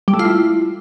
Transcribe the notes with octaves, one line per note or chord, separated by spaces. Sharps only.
G3
A3
F4
E4